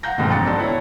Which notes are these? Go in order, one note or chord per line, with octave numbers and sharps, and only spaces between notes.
F5 F#5 A#5 G6 A#6
F2 G#2 B2 D#3
A1 C#3 A6 C#7
B3 D4 F#4 A4 C5
E4 C#5